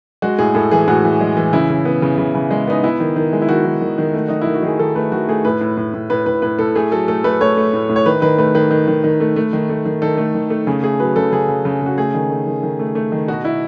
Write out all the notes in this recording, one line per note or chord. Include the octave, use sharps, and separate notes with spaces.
G#3 F#4
A2 G#4
A2 A4
E3 G#4
A2 F#4
E3
G#3
E3
C#3 E4
C#3
B3
C#3
C#3
C#3
G#3
B3 D#4
B3 E4
D#3
D#3
G#3
E4
D#3 F#4
D#3
D#3
D#3
A3
D#3 D#4
D#3 E4
F#4
D#3 G#4
D#3 A4
A3 B4
D#3 F#4
A3 G#4
A2 B4
A2
A2
A2
A2 B4
A2 B4
A2 B4
A2 A4
A3 G#4
F#3 A4
A3 A4
A3 B4
A3 C#5
A3
A2
A2
C#5
D#3 B4
D#3 B4
A3 B4
D#3 B4
D#3
D#3
D#3
A3
A3
D#3
A3
D#3
D#3 A4
A3
D#3
A3
C#3 G#4
A3 G#4
F#3 B4
C#3 A4
C#3 G#4
C#3
C#3
C#3 F#4
A3 G#4
D#3
A3
D#3
D#3
A3
A3
D#3
B2 F#4
B2 E4